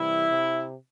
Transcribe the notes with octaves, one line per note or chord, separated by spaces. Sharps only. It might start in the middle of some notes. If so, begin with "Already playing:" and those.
Already playing: C3 E3 G3 E4
C3